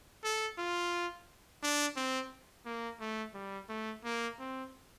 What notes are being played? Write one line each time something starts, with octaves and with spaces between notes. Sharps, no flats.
A4
F4
D4
C4
A#3
A3
G3
A3
A#3
C4